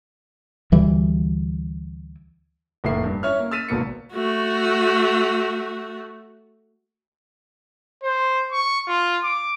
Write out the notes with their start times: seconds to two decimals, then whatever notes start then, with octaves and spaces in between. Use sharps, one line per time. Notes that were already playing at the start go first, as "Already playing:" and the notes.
0.72 D2 E3 G3
2.84 F1 A2 A#3 E5 C7
3.04 G2
3.23 C#4 E4 C#5 E5 F6
3.39 A#3
3.51 E6 F6 A6 B6 D#7 E7
3.69 G#1 B2 A#3 C#7
4.13 A3 F#4
8.03 C5
8.52 C#6
8.88 F4
9.24 D6